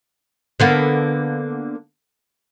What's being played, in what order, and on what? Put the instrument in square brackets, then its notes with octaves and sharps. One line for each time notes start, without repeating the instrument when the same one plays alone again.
[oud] D3 A#3 B3